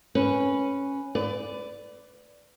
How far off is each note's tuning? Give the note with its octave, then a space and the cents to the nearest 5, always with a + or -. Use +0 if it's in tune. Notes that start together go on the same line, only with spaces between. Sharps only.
C#4 -5 B4 +0
B4 +25 D5 -5